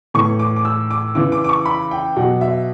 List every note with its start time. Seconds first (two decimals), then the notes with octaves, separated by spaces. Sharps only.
0.14 A2 E3 C#6
0.39 D6
0.56 D6
0.65 E6
0.91 D6
1.15 C#3 E3 D6
1.32 D6
1.44 D6
1.49 C#6
1.65 B5
1.91 G5
2.16 B2 F#3 F#5
2.41 E5